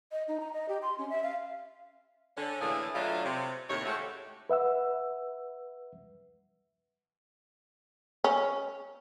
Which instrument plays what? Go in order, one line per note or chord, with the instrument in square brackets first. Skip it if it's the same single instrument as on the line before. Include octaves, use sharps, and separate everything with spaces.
[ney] D#5
D#4
A#5
D#5
G4
C6
C#4
E5
F5
[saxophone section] D3 C#4
A2 D3 E3 A3 A#3 G#4
B2 F#3 A3 C#4 D4 F4
C3
D#2 A2 C3 C4 C#5
G#3 A3 C#4 E4 F#4 G4
[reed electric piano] B4 E5 F#5 E6
[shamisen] C#4